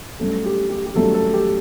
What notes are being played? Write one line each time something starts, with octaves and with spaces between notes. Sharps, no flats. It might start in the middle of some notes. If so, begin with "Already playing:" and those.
G2 F#3 A3 C#4 A4
G4
G4
G4
G2 F#3 A3 C#4 A4
A4
G4